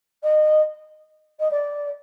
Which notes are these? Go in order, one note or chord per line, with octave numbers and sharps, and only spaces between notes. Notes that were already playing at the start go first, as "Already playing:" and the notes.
D#5
D#5
D5